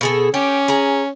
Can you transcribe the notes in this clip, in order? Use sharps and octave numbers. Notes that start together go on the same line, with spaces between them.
B2 G#4 A4
C#4 G4
G#4 A#5